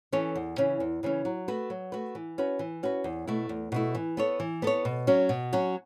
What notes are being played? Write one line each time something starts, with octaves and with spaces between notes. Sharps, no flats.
E3 C#4 A4 C#5
E2
C#3 E3 C#4
E2
C#3 E3 C#4
F#3
A3 F#4 B4
F#3
A3 F#4 B4
E3
C#4 F#4 B4
E3
C#4 F#4 B4
E2
B2 A3 E4
E2
B2 A3 E4
E3
B3 A4 C#5
E3
B3 A4 C#5
B2
F#3 C#4 F#4
B2
F#3 C#4 F#4